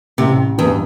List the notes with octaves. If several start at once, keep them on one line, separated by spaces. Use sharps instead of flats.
A1 C3
E2 G2